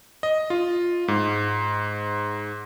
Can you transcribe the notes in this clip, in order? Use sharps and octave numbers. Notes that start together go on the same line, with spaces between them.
D#5
F4
G#2